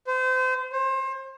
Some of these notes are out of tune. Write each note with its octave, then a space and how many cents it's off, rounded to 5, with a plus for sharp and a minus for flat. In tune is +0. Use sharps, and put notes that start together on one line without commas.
C5 -30
C5 +30